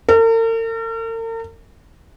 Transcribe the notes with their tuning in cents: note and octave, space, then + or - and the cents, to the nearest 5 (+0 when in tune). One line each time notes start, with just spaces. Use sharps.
A#4 -45